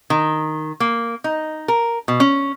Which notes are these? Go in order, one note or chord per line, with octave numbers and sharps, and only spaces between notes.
D#3
A#3
D#4
A#4
B2
C#4